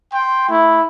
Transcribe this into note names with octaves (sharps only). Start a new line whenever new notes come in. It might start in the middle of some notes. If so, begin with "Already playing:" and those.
G5 C6
A3 E4